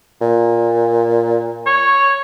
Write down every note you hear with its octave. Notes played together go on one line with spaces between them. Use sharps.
A#2
C#5